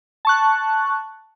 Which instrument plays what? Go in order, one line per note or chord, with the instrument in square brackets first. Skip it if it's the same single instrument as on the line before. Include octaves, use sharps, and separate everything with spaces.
[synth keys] A5 C#6 F#6